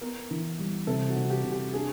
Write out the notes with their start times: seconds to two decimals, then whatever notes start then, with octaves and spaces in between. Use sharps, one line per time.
0.01 B3 A#4
0.31 E3
0.59 G3
0.87 C3 A4
1.09 F#4
1.16 C3
1.30 G4
1.44 C3
1.52 G4
1.74 D4 G#4